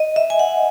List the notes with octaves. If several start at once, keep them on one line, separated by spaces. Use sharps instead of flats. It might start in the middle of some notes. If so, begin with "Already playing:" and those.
Already playing: D#5
E5
G#5
F#5